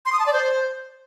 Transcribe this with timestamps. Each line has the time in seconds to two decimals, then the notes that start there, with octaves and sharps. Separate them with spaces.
0.06 C6
0.13 D#6
0.19 A5
0.26 D5
0.33 C5